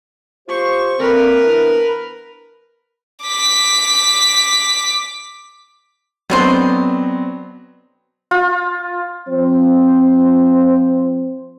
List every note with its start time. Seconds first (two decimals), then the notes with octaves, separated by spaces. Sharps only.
0.48 F4 G4 C5 C#6
0.99 D3 A#3 C4 A#4 B4
1.43 E3 B3 D4
3.24 D6 B6
6.30 B2 D3 F#3 B3 C4 C5
8.31 F4
9.28 F3 C4 C5